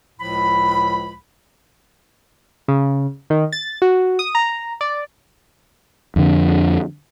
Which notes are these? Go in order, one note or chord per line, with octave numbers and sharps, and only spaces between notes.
C#2 A2 F3 B5
C#3
D#3
A6
F#4
D#6
A#5
D5
F2 D3